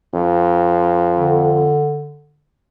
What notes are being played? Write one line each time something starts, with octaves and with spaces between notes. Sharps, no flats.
F2
D3